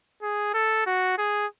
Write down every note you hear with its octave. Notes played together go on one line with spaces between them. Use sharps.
G#4
A4
F#4
G#4